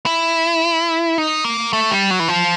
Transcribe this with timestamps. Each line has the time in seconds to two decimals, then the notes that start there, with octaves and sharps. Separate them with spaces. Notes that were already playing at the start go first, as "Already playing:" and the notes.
0.06 E4
1.18 D#4
1.44 A#3
1.73 A3
1.91 G3
2.10 F#3
2.20 E3
2.29 F3